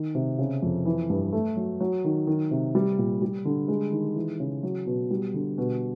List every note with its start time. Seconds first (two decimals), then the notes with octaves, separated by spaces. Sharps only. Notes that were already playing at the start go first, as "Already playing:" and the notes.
Already playing: D#3
0.15 C3
0.39 C#3
0.62 F2
0.85 E3
1.10 G2
1.32 A3
1.56 F#3
1.81 F#3
2.04 D#3
2.27 D#3
2.51 C3
2.75 G3
2.98 A#2
3.22 G3
3.45 D3
3.68 G#3
3.92 D#3
4.16 E3
4.40 C#3
4.63 F#3
4.87 B2
5.11 G3
5.34 D3
5.58 B2